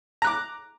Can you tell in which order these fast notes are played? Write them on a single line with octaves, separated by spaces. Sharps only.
A#5 F#6 D6